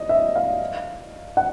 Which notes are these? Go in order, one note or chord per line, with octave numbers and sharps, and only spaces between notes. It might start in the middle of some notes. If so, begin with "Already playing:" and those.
Already playing: D#5
E5
F5
F#5